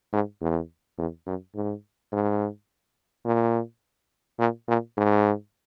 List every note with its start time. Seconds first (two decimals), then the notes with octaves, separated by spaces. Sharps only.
0.13 G#2
0.41 E2
0.98 E2
1.26 F#2
1.55 G#2
2.12 G#2
3.25 A#2
4.39 A#2
4.68 A#2
4.97 G#2